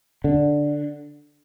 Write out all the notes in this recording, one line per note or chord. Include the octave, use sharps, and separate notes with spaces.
D3